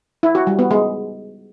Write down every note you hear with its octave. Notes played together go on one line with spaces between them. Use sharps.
E4
F#4
G3
B3
G#3